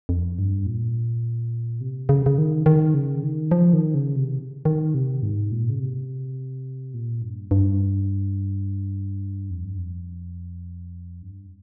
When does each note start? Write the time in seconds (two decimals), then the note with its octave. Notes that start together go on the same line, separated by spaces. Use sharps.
0.09 F2
0.39 G2
0.66 A#2
1.81 C3
2.09 C#3
2.26 C#3
2.38 D#3
2.66 D#3
2.94 C#3
3.23 D#3
3.51 F3
3.73 D#3
3.94 C#3
4.16 C3
4.65 D#3
4.94 C3
5.23 G#2
5.52 A#2
5.69 C#3
5.80 C3
6.94 A#2
7.22 G2
7.51 G2
9.50 F2
9.64 G2
9.78 F2
11.22 G2